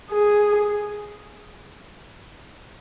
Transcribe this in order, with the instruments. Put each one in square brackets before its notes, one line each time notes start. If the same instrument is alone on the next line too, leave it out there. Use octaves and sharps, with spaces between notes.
[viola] G#4